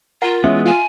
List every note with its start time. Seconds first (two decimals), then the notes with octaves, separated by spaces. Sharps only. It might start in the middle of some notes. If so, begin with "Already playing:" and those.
0.22 F4 A#4 F#5
0.44 E3 G#3 B3 C#4 E5
0.65 F4 G#5